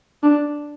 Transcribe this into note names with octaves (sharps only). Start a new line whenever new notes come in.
D4